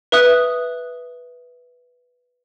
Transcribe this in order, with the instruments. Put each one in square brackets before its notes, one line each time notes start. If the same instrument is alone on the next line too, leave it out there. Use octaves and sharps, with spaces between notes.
[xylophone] B4 E5 D#6 F#6